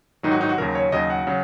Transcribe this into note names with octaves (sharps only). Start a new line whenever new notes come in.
G#2 D#3 F#3 D#4
F#4
D#4
F#4
D#2 C#3 F#3 A#4
C#5
D#2 C#3 F#3 D#5
F#5
C#3 F#3